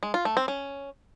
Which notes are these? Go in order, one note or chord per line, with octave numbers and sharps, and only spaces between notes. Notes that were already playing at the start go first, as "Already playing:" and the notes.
G#3
F4
A3
C4
C#4